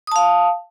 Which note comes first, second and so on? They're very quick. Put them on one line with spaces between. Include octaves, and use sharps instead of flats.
D#6 A5 F5